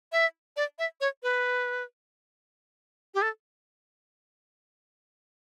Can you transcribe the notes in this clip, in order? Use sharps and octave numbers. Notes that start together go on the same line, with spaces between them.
E5
D5
E5
C#5
B4
G4
A4